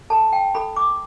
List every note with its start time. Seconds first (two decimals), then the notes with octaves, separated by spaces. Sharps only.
0.10 A4 A5
0.33 G5
0.55 A4 B5
0.76 D6